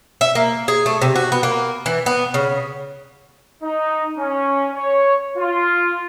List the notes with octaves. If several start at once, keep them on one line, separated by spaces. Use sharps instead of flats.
E5
A#3
G#4
A3
C3
F#4
B3
A#3
E3
B3
C#3
D#4
C#4
C#5
F4